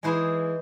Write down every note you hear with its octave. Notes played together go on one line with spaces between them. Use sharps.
E3 G#3 E4 G#4 C5